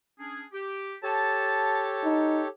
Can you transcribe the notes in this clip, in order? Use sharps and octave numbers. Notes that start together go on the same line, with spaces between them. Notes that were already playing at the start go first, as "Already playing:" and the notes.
C#4 D4 G#4
G4
G4 A4 C#5 A5
D#4